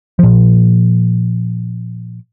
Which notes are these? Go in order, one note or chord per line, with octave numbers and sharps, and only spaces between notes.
A#2 F3